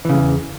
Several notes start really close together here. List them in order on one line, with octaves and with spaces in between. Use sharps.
E3 C#3 G2 E2